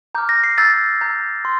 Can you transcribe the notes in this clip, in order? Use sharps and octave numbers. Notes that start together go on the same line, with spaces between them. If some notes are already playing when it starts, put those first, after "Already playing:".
A#5 D6 F6 G6
A#6
C7
A#5 E6 G6 A6
A#5 E6 G6
C6